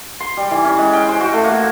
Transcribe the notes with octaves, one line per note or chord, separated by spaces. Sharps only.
C6
G3
E3
C#4
G#3
G5
C5
F#4
A3
A#3